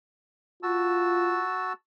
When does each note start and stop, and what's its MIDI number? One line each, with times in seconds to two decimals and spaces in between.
0.63 1.45 65
0.63 1.73 66
0.63 1.73 81
0.63 1.73 88